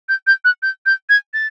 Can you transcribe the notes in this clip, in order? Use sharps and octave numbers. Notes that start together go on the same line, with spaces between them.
G6
G6
F#6
G6
G6
G#6
A6